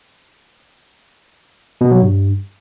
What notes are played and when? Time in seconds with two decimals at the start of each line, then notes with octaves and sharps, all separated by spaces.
1.81 B2
1.91 F#3
2.02 G2